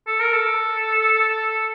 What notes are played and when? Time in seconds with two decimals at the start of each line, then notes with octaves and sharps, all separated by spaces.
0.07 A4
0.20 A#4
0.33 A4